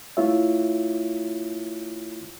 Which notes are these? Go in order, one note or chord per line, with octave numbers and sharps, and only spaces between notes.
A3 E4 F4 C#5 E5